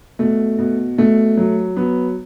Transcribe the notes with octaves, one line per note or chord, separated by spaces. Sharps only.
B2 A3
B2
B2 A3
F#3
F#3 B3